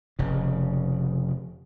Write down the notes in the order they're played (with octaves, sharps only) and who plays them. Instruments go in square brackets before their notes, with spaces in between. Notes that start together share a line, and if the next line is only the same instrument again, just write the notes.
[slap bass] F1 C#3